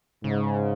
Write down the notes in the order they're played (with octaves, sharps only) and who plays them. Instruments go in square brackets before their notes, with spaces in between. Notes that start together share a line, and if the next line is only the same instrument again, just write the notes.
[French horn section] G#2 [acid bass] C#3